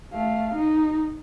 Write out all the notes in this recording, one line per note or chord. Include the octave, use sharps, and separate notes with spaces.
A3 F5
D#4